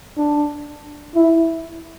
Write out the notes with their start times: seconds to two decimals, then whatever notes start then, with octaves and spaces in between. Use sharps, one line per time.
0.18 D4
1.15 E4